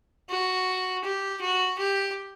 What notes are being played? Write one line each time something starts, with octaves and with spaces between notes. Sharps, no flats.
F#4
G4
F#4
G4